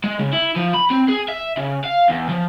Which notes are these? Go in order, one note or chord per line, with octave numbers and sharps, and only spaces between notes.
G#3
C#3
E4
F3
B5
C4
G#4
E5
C#3
F5
E2
F3